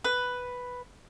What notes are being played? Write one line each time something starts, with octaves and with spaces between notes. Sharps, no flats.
B4